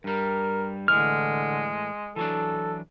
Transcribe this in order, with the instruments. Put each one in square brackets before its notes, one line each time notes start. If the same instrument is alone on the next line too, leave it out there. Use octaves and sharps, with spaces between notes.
[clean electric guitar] G2 G3 [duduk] A#4
[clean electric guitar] A2 E3 [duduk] D3 [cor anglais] G#3 [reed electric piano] F6
[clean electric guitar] E3 F#3 D4 [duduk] A4